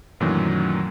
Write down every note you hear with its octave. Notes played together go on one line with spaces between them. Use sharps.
F#2 A#2 D#3 E3 F#3 A3